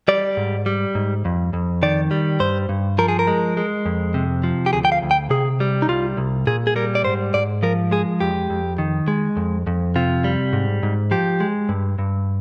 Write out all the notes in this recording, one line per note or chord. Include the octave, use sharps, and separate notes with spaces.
G3 D5
G#2
G3
G#2
F2
F2
D#3 D5
G3
G2 C5
G2
F3 A#4
G#4
A#4
G#3
G#3
F2
C3
F3
G4
D2 G#4
G5
F5
D2
G5
C3 G#4
G3
D#4
C2 F4
C2
A#2 G#4
G#4
G3 A#4
D5
G#2 C5
G#2 D5
F3 A#4
G#3 G#4
F2 G4
F2
D#3
G#3
F2
F2
C3 F4
G3
G#2
G#2
F3 G4
G#3
G2
G2